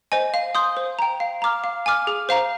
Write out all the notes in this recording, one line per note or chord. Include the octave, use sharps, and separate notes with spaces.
C5 D#5 G#5
F5
C6 D#6 G6
C5
G5 A#5
F5
A#5 D6 F6
F5
G#5 D6 F6
G#4
C5 F5 A#5